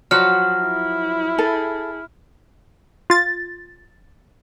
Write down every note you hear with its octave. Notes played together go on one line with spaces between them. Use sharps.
F3 F#3 F#4 F6
E4
G#4 A4
F4 A6